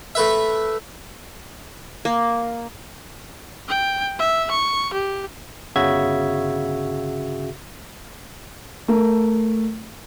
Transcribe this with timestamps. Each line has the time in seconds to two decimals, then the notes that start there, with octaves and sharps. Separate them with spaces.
0.15 A3 B4 E5
2.05 A#3
3.69 G5
4.19 E5
4.51 C#6
4.93 G4
5.76 G1 C#3 F#4 E5 G#6
8.88 A3 A#4